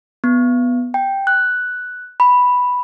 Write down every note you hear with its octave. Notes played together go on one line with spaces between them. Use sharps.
B3
G5
F#6
B5